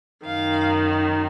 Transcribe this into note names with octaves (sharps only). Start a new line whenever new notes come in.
F#2 D#3 F5